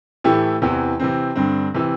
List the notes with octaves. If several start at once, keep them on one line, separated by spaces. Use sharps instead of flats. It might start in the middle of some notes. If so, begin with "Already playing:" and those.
A2 E3 A3 E4 G4
E2 C3 E3
C3 E3 C4
G2 D3 C4
C3 E3